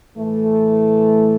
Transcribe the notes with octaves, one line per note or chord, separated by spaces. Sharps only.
A2 E3 A3